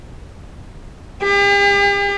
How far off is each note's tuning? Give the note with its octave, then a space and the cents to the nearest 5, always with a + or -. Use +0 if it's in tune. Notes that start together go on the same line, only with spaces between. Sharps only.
G4 +45